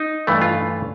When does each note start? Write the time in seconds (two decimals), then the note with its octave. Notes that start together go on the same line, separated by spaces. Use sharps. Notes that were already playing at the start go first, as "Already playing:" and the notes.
Already playing: D#4
0.27 G2 E3 A3
0.42 F4